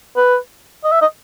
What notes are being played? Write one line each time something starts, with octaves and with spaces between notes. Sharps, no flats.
B4
D#5
E5
D#5